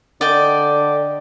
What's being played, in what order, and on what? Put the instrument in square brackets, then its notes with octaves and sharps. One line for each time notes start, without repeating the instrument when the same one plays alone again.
[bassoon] D3 [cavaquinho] D5 D#5 G5